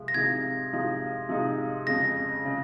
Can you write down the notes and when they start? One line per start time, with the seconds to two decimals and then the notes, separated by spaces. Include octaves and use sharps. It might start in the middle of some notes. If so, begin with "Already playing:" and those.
Already playing: C3 F3 G#3
0.08 A#6
0.14 C3 F3 G#3 D#4 G#6
0.72 C3 F3 G#3 D#4
1.29 C3 F3 G#3 D#4
1.86 F2 C#3 G#3 A#6
2.45 C#3 G#3